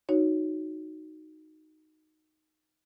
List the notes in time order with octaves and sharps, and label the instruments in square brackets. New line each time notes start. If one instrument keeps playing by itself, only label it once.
[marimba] D#4 F#4 C#5